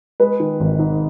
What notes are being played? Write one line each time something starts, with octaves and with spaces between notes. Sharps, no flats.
G#3 B4
D#3
G#1
G#2